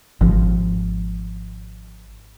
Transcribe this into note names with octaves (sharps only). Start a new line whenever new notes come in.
G#1 F3